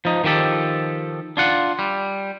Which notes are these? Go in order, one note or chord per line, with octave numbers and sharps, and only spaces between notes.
F3 D#4
D#3 F3 G4 A4
D4 F4 F#5
G3